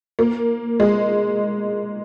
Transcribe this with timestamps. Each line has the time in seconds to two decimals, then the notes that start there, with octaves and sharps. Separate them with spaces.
0.19 A#3
0.80 G#3